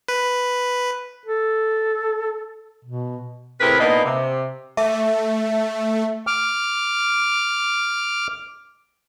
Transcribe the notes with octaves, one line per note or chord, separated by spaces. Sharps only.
B4
A4
B2
A2 C3 E4 G#4 A#4 B4
A#2 A#3 B3 D4 D#4
C3
A3 E5
D6 F6